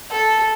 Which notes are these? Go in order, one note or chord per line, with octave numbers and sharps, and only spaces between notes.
A4